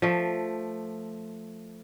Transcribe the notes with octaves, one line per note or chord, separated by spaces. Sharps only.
F3 A3